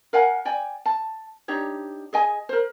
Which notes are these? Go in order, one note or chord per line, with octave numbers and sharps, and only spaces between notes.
A#4 F5 F#5 G#5
D5 G5 G#5
A5
D4 D#4 G4 C#5
G#4 D#5 G#5
A#4 C5